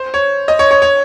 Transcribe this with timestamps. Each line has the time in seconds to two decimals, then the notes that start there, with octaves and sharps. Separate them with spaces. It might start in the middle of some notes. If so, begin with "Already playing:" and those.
Already playing: C5
0.14 C#5
0.48 D#5
0.59 C#5
0.71 C#5
0.82 C#5